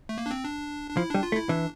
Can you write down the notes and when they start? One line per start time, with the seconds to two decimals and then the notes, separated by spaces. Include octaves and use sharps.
0.09 A3
0.18 A#3
0.26 D4
0.31 C4
0.44 D4
0.91 D4
0.97 F3 E4
1.10 G3 D4
1.23 F4
1.32 A3
1.36 E4
1.49 E3 D4